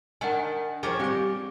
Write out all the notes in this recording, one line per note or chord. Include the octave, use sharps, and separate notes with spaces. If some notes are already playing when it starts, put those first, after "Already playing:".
D#3 D4 F#5 G#5
D#3 F3 G#4 C#5 G#5 D6
G3 C4 G4 D6